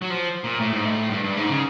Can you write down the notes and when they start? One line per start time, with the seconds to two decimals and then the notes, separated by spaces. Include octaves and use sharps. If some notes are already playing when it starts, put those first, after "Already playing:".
0.02 F#3
0.10 F3
0.44 A#2
0.60 A2
0.73 G#2
0.85 A2
1.10 G2
1.24 G2
1.37 G#2
1.48 C#3